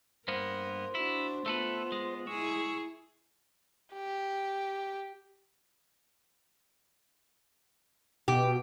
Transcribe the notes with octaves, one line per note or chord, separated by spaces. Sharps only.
G2 A#3 B3 A#4 C5
D4 E4 F#4
A3 B3 F4 A4 B4
G#3
E4 G#4 C#6 E6
G4
B2 G4